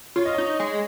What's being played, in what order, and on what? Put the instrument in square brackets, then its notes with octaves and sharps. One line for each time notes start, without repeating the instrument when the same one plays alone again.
[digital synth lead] F4 [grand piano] C#5
[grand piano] D#5
[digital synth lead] D#4 [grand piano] C#5
[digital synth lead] G#3